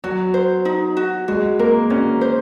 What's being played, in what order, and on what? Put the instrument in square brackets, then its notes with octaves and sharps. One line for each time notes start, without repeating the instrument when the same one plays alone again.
[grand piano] F#3 [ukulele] F#4
[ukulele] C5
D#4
F#4
[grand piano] G#3 [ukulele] F#4
[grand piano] A#3 [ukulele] A#4
[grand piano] C#4 [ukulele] F#4
[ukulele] C5